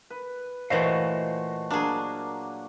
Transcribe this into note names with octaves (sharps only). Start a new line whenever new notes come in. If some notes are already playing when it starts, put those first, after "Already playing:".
B4
A#2 E3 A3 F#4 C5 D#5 F5
F#3 A#3 D4 G#4